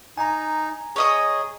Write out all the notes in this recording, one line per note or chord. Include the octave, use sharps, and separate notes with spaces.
D#4 G#5 A#5
G#4 C#5 D#5 D#6